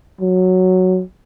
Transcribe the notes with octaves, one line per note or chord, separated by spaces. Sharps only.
F#3